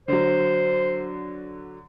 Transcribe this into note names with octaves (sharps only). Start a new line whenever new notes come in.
D3 F#3 C5